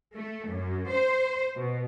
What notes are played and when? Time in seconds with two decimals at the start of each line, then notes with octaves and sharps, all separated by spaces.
0.15 A3
0.47 F#2
0.89 C5
1.56 B2